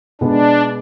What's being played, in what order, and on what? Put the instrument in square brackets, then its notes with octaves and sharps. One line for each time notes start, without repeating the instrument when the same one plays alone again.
[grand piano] B2 G#3 B3 [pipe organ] D4